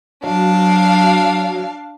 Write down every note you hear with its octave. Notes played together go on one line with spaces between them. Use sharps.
F#3 D4 F5